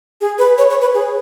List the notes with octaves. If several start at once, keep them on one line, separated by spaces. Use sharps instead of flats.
G#4
B4
C#5
C#5
B4
G#4